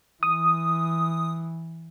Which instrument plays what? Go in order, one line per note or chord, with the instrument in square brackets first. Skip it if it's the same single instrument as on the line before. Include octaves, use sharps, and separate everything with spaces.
[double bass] E3 [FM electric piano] D#6